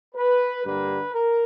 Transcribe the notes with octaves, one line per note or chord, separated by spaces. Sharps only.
B4
G2 D3 G3 A#3 B4
A#4